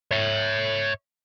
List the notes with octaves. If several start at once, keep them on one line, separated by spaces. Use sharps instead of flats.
C#5 E5